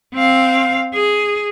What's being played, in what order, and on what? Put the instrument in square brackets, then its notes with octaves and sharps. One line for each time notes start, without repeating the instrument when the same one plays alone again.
[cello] C4 F5
G#4